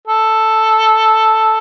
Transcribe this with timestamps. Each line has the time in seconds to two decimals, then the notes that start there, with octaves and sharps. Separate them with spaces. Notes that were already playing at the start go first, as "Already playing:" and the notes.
0.07 A4